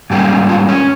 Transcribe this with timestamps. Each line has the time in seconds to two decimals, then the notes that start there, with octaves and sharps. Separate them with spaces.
0.10 G#2 G3 A#3 C#4
0.49 F4
0.69 C#4